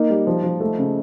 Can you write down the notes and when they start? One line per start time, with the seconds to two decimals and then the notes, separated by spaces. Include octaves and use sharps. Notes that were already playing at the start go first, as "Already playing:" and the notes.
Already playing: A#3 D#4
0.10 G3
0.27 F3
0.43 F3
0.60 A3
0.78 C#3